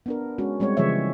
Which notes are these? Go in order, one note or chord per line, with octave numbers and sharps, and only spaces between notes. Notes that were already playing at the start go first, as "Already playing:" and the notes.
B3 D4 A#4
G#3 C#4 F#4
G3 G#3 C4 C#5
C#3 E3 F3 G#3 C#5 E5